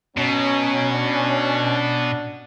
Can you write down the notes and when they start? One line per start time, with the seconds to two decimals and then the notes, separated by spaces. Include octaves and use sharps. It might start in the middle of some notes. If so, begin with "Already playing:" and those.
0.17 B2 F#3 C#4
0.93 D4